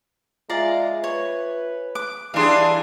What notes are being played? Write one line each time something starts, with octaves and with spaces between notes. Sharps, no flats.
G#3 F4 D5 E5 F5 G#5 A#5
B4 C#5
D6 F#6
E3 G3 D4 G#4 F5 C6